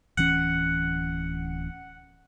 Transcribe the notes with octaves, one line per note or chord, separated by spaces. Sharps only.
D1 E3 C#4 F#5